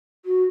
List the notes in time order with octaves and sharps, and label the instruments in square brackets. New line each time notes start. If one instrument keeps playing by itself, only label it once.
[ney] F#4